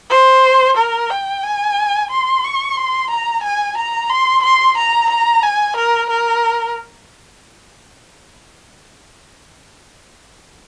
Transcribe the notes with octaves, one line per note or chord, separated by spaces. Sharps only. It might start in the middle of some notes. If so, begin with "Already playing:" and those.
C5
A#4
G5
G#5
C6
C#6
C6
A#5
G#5
A#5
C6
C6
A#5
A#5
G#5
A#4
A#4